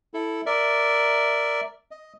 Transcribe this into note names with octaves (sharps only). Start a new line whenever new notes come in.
E4 A4
A#4 D5 E5
D#5